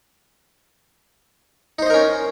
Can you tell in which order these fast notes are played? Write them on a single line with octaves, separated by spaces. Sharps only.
D#4 C5 D#5 A#4 C#4